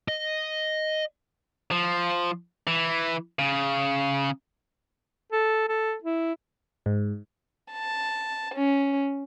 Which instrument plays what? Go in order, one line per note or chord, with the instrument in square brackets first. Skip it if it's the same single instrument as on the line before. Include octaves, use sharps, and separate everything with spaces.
[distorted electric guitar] D#5
F3
E3
C#3
[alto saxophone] A4
A4
E4
[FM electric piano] G#2
[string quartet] A5
C#4